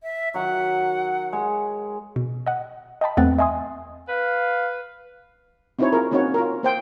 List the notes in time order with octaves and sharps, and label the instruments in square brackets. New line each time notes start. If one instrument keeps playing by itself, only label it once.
[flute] E5
[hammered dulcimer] D#3 F#3 [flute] F#5
[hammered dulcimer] G#3
[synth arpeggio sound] B2
D#5 F#5
D#5 G5 A5 B5
E2 A3 B3 C4 F#6 A6
D#5 E5 G#5 C6 D#6
[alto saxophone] B4 [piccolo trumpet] F5
[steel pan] C4 D#4 E4 F#4 C5 C#5
F4 G#4 A#4
A#3 C4 C#4 D#4 F#4 C#5
F4 A#4
A#3 C5 G5